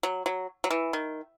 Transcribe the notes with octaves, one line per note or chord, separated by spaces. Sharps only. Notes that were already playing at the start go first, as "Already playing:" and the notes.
F#3
F#3
F#3
E3
D#3